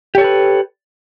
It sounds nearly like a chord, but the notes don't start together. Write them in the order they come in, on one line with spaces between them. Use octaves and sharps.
G4 C#5 A4 B4